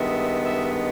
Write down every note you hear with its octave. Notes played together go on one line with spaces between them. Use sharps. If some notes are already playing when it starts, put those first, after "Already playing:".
Already playing: G2 D#3 G#3 B3 E5
E5